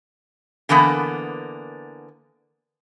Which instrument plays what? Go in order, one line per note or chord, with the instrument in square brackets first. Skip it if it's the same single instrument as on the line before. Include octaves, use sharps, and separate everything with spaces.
[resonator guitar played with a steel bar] D3 E3 A#3 B3